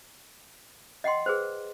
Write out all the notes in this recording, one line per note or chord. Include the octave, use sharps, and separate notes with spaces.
D#5 F#5 G5 C6
G#4 B4 C5